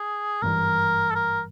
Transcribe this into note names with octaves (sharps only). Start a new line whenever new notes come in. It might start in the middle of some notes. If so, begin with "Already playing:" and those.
Already playing: G#4
G#1 G2 E3 G3 A#4
A4
A#4